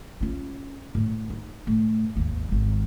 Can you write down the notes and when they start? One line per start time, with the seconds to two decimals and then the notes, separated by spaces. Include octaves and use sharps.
0.21 C#4 F4
0.95 A2
1.30 D#4
1.67 A2
2.15 G#1 D#2
2.49 G#1 D#3